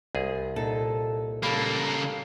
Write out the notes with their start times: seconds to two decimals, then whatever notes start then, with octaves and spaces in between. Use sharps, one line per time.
0.15 C2 G#4
0.56 A#2 D#4 A4
1.43 C#2 G3 A#3 A4